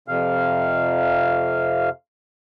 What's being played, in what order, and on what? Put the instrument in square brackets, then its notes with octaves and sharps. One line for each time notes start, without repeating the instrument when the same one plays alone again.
[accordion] F2 C3 F5